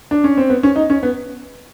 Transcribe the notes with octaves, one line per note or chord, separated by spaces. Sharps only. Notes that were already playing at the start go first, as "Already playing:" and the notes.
D4
C#4
C4
B3
C#4
D#4
C#4
B3